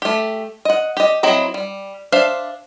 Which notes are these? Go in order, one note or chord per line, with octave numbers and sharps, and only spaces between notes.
A3 G4
D#5 F#5
G4 D#5
F#3 C4 E4 D#5 A#5
G3
D4 C5 E5 F5